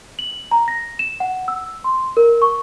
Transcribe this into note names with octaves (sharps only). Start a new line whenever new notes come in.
F#7
A#5
A#6
E7
F#5
E6
C6
A#4
C#6